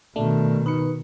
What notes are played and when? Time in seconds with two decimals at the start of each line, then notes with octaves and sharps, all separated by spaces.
0.16 B2 D#3 A3 D4
0.66 D#4 B4 C#7